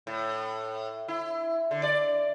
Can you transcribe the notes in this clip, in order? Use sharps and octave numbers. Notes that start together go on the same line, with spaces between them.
A2
E4
D3
D5